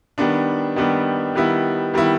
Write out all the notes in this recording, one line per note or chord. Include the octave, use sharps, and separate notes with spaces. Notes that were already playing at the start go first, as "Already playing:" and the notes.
D#3 G3 B3 D4
D#3 G3 B3 D4
D#3 G3 B3 E4
D#3 G3 B3 E4